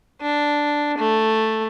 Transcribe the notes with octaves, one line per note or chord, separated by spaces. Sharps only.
D4
A3